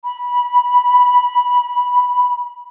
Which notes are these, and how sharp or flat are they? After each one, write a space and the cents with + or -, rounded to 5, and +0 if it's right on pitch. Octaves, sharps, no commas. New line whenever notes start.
B5 -20